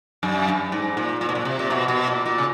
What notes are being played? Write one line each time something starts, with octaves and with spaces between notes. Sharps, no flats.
F#2
G2
G#2
A#2
A#2
B2
A#2
C3
A#2
B2
B2
A#2
A#2
C#3